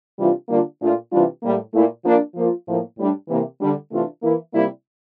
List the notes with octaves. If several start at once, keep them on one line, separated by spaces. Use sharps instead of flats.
C3 E3 G3 D4 F4
D3 G3 A#3 D4 F4
A#2 A3 D4 F4
C3 E3 G3 D4 F4
A2 G3 A#3
A#2 A3 E4
F3 A#3 D4
F3 A#3 F4
A2 F3 A#3
A2 G3 D4
C3 E3 A#3
D3 G3 D4
C3 E3 A3 D4 F4
E3 A#3 E4
C3 G3 A#3 E4